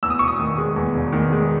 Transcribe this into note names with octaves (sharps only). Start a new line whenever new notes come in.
E2 E6
D#6
E1 C#6
D#6
D#3
G#3
E2
E1
D#3
G#3